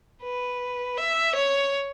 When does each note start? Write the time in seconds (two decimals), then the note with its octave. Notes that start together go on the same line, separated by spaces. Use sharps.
0.23 B4
0.98 E5
1.35 C#5